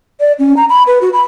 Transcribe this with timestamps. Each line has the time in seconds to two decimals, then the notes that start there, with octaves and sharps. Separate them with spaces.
0.20 D5
0.39 C#4
0.57 A#5
0.70 B5
0.87 B4
1.01 F#4
1.13 B5